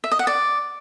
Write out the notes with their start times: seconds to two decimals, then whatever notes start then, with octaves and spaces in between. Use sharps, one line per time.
0.04 E5
0.11 D#5
0.19 F#5
0.27 D5